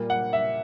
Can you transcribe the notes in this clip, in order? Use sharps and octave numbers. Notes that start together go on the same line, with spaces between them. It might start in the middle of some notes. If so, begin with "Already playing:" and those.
Already playing: A#2 G3 A#3
F#5
E5